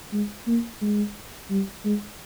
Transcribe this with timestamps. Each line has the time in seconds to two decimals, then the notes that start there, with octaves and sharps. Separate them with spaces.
0.13 G#3
0.47 A#3
0.82 G#3
1.50 G3
1.85 G#3